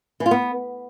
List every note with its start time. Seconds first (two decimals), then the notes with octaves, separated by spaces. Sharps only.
0.20 E3
0.26 F4
0.31 B3